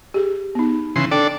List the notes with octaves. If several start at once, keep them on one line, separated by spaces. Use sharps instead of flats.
G4 G#4
B3 D#4
C#3 E3 C6
D4 A4 D5 G5